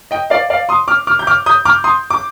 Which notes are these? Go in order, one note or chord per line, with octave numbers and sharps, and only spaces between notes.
D#5 G5
D5 F5
D5 F5
C6 D#6
D6 F6
D6 F6
G6
D6 F6
D#6 G6
D6 F6
C6 D#6
D6